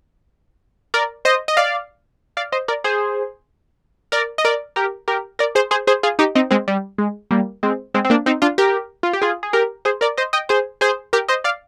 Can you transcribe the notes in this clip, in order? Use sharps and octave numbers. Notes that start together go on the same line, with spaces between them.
A#4 D5
C5 D#5
D#5
D5 F5
D5 F5
C5 D#5
A#4 D5
G#4 C5
A#4 D5
D#5
A#4 D5
G4 A#4
G4 A#4
A#4 D5
G#4 C5
G#4 C5
G#4 C5
F4 G#4
D#4 G4
C4 D#4
G#3 C4
G3
G#3
G3 A#3
G#3 C4
G#3 C4
C4
A#3 D4
C4 D#4
D4 F4
G4 A#4
F4
G4
F4 G#4
G#4
G4 A#4
G#4 C5
A#4 D5
C5 D#5
D#5 G5
G#4 C5
G#4 C5
G4 A#4
C5 D#5
D5 F5